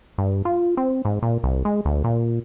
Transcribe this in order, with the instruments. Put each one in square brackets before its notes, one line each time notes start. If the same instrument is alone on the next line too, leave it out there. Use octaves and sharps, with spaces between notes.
[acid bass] G2
F4
C4
G#2
A#2
C2
G#3
D2
A#2